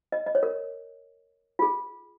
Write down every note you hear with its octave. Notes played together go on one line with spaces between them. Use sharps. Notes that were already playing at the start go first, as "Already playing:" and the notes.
D#5
D#5
C#5
A#4
F4
G#4